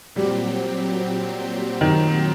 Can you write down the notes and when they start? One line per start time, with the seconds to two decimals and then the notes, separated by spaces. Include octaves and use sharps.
0.15 A#2 F#3 G3 C4 G4
1.81 D#3